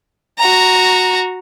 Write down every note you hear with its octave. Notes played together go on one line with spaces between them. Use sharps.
F#4 A#5